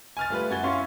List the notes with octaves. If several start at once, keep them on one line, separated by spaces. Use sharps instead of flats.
G#5 F6 A6
G3 A3 F4 B4
F#2 F#4 G#5 G#6 A6 G7
C#4 E4 F5 C6 C#6